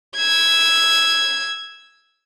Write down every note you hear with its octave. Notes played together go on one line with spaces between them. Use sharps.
E6 G#6